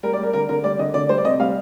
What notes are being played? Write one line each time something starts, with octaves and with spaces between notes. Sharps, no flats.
G3 A#4
D5
G3 A#4
D3 A#4
D3 A#4
G3 D5
D3 D#5
D3 D5
G3 C5
D5
C3 D#5
G3 F5